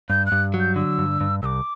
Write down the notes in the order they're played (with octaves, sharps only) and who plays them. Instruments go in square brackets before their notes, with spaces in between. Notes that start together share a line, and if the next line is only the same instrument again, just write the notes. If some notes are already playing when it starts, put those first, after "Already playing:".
[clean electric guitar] G2 [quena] G6
[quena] F#6
[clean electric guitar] G2
F#3
[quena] G6
[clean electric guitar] D3 [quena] E6
[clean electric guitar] G2
G2
[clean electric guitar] C2 [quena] D6 E6